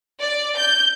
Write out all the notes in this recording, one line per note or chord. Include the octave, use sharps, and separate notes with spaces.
D5
G6